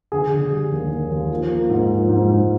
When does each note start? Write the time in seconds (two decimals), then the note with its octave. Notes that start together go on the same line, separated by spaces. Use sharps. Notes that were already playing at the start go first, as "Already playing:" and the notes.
0.12 D3 G#4
0.32 D3
0.52 G3
0.72 D#2
0.91 D#2
1.11 D#2
1.31 F3
1.50 A#3
1.70 G#2
1.90 F3
2.09 G#2
2.29 G#2